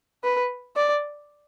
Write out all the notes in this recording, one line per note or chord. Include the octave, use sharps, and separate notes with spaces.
B4
D5